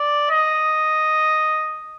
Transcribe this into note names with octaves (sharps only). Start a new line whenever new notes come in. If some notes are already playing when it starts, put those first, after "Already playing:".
Already playing: D5
D#5